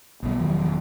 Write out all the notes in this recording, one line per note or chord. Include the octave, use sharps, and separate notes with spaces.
B1 B2 G3
E1 F#2 D#3 F3